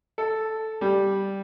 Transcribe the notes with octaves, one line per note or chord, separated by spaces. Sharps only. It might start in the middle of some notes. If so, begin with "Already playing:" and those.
A4
G3